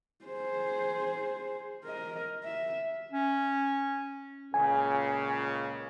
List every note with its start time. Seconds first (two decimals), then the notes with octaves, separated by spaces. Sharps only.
0.25 G#4 C5
1.85 A#4 D#5
2.44 E5
3.11 C#4
4.54 C#2 A#2 C#3 G#5